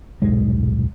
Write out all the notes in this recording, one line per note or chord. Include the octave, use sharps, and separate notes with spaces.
D#1 B1 G#2 G#3